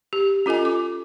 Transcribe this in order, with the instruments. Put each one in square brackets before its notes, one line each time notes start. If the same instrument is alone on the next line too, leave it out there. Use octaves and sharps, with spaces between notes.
[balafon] G4
C#4 F4 A4 D#5 G#5
D6